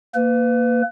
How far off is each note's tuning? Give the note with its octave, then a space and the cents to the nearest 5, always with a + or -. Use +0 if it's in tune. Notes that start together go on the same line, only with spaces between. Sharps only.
A#3 +0 B4 +30